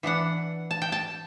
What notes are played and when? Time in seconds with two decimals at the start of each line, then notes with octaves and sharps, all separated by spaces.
0.03 E3 B3 D4 F#5
0.71 A5
0.82 G5
0.92 A5